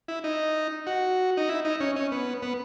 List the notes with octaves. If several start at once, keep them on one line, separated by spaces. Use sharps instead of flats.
E4
D#4
F#4
D#4
E4
D#4
C#4
C#4
B3
B3